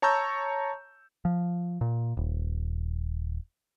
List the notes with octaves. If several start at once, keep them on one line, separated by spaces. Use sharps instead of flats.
C#5 A5 A#5 C#6 E6 G6
F3
A#2
D#1